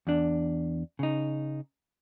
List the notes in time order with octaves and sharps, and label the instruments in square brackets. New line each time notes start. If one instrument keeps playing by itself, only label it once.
[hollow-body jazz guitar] E2 D4
C#3 D#4